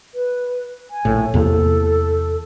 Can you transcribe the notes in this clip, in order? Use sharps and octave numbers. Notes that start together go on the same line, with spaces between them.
B4
G#5
A#1 A2
E2 C3 A#3 A4